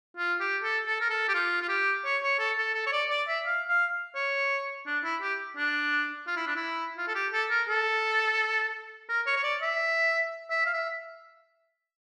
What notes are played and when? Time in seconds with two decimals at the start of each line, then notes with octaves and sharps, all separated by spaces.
0.17 F4
0.40 G4
0.63 A4
0.86 A4
1.00 A#4
1.10 A4
1.29 G4
1.34 F4
1.61 F4
1.68 G4
2.05 C#5
2.22 C#5
2.39 A4
2.57 A4
2.74 A4
2.86 C#5
2.92 D5
3.10 D5
3.27 E5
3.45 F5
3.68 F5
4.15 C#5
4.86 D4
5.04 E4
5.21 G4
5.57 D4
6.27 F4
6.36 E4
6.46 D4
6.56 E4
6.97 F4
7.08 A4
7.15 G4
7.32 A4
7.50 A#4
7.68 A4
9.09 A#4
9.26 C#5
9.36 C#5
9.43 D5
9.61 E5
10.50 E5
10.66 F5
10.73 E5